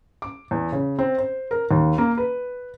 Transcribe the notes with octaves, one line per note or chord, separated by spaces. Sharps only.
D6
E2
C#3
C4
C5
A#4
D#2
A#3
B4